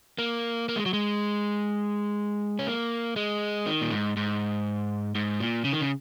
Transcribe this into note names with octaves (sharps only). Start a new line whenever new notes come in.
A#3
A#3
G#3
F#3
G#3
C#4
A#3
G#3
D#3
A#2
G#2
G#2
G#2
A#2
C#3
D#3
C#3